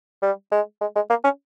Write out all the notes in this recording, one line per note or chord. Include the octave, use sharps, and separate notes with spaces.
G3
G#3
G#3
G#3
A#3
C#4